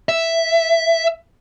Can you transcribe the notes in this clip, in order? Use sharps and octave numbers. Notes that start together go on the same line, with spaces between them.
E5